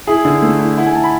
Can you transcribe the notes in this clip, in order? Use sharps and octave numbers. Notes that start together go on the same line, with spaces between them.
E4 G#4
D3
A3
E4
E4 F#5
G#5
E4 A5
B5